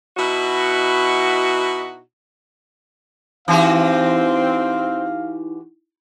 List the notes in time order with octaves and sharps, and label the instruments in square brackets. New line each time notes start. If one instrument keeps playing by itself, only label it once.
[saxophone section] B2 D#4 E4 F#4
[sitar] E3 F#4 G4 [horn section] C4 [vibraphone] D#4 E4 [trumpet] F5